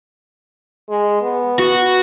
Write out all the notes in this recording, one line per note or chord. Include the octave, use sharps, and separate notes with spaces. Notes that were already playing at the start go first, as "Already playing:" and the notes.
G#3
B3
F#4